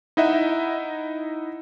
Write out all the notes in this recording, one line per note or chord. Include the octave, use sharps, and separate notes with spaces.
D#4 E4 D#5 E5 F#5